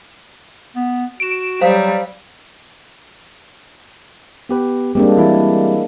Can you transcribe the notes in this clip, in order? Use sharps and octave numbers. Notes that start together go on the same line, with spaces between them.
B3
F#4 D7 E7
F#3 G3 C5 F5
B3 G4 B4
G3 G#3 A#3 C4 D4 G4
E3 E4